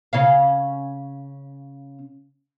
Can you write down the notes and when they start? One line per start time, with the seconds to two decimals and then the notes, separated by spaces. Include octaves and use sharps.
0.13 C#3 C#4 F5